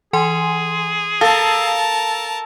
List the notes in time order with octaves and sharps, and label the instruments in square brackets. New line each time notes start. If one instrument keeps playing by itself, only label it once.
[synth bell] E3 G#5 C6 [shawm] G#4
[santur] A4 [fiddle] A#4 A5 [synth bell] F5